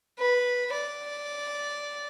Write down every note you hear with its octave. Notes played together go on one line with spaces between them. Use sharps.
B4
D5